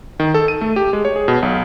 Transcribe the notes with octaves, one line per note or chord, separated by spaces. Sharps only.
D#3
A4
D#7
A3
G4
G#3
C#5
G#4
B2
B1